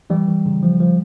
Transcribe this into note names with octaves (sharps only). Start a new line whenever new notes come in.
E3 G3
E3
C#3
F3
F3